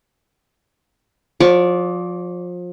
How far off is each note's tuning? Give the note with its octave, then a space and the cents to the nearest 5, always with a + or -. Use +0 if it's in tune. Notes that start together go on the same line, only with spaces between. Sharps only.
F3 +30 D5 -15 C#6 +0